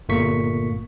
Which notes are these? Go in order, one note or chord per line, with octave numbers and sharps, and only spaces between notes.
G1 A#2 A3 A#3 C#6 B6